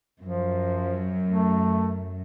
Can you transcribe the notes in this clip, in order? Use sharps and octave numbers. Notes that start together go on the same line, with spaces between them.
F#2 F3
A3